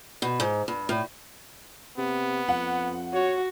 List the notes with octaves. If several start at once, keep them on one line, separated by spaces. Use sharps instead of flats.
B2
G#2
G2
A2
C3 B3
F2 F#5
F#4 C#5